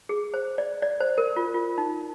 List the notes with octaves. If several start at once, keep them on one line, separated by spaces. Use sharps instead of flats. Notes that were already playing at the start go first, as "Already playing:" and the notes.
G#4
C5
D5
D5
C5
A#4
F4
F4
D#4